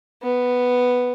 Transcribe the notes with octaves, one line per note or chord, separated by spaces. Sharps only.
B3